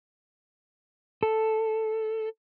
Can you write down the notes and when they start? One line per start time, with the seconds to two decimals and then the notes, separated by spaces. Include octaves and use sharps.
1.23 A4